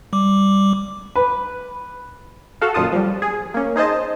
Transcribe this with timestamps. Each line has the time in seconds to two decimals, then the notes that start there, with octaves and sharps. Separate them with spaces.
0.13 G3 D6
1.16 B4
2.61 F#4 A4 F5
2.74 F#2 A#2 D#3 F4 A5 D#6
2.92 F3 G3
3.22 G#4
3.54 A#3 C#4
3.76 D#4 G#4 C5 D#5 A5